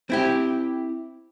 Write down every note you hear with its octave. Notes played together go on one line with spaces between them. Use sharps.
C4 E4 G4